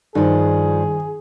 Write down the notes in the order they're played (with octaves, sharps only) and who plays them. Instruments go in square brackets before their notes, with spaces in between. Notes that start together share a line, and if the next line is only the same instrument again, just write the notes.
[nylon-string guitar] G2 F3 [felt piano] D#3 [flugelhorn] G#4